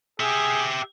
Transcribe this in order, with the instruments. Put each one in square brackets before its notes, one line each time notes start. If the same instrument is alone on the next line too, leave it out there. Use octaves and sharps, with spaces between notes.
[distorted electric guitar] G4 E5 [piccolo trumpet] G#4